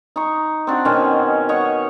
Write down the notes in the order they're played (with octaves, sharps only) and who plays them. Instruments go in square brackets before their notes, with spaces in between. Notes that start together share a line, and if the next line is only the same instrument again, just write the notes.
[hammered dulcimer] D#4 C#6
C4 D4 F#4
B2 D#3 C4 C#4
C#5 D#5 F#5 C#6